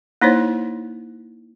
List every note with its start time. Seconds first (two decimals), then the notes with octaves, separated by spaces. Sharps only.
0.21 A#3 D#4 E4 C5 C#5